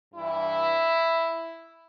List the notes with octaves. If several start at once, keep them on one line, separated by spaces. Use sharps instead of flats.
G2 E3 G3 E4